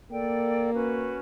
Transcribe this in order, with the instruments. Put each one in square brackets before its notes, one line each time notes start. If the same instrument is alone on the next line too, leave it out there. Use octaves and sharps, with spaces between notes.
[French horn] A#3 [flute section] A4 D5 G5
[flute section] C#4 F#4 B4